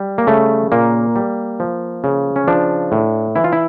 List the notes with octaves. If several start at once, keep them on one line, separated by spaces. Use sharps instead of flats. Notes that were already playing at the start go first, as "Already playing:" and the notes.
Already playing: G3
A#3
C#3 A3
A#2 A#3
G3
F3
C#3
C#4
F3 D4
A2
E3 E4
F4
E4